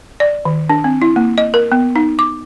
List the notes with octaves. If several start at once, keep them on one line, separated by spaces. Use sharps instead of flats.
D5
D#3
D4
C4
E4
A#3
D#5
A#4
B3
D#4
D6